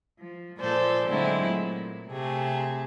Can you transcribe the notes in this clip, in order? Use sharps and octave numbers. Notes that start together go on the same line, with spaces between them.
F3
A#2 F3 A4 C5 D5 G#5
D3 F#3 G#3 A3 C4 E4
A#2
C3 A3 G#4